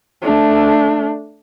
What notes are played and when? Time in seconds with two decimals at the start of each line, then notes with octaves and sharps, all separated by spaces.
0.22 A3 D4